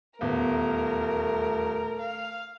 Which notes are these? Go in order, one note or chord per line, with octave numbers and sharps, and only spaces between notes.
D#1 E2 A3 A#4
F5